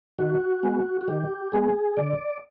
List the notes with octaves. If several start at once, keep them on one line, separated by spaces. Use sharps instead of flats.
D#3 F#4
G#3 B3
F#4
D#3 G4
G#3 B3 G#4
D3 D5